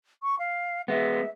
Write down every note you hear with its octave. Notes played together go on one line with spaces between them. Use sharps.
C#6
F5
G#3 B3 E5